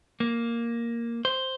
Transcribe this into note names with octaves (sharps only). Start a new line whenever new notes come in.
A#3
C5